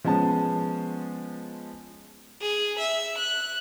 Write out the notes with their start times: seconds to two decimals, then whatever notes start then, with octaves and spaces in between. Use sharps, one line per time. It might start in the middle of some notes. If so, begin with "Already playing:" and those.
0.04 F3 G#3 B3 C#4 A5
2.41 G#4
2.79 E5
3.18 F#6